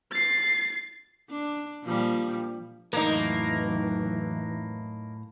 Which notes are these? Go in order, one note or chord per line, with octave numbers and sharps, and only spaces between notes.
A6 C7
D4
A#2 F3 G3
F2 A2 E3 F#3 A#3 D#4 A#5